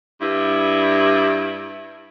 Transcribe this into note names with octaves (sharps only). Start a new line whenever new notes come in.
G2 E4